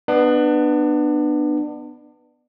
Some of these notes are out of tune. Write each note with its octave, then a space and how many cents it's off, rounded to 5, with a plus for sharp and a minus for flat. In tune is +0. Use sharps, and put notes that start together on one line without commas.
B3 +0 D4 +30